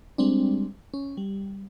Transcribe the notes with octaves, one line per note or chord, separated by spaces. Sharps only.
G3 G#3 C4 D4
C#4
G3